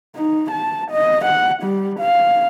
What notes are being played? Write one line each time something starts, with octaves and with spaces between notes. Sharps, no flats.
D#4
A5
D#5
F#5
G3
F5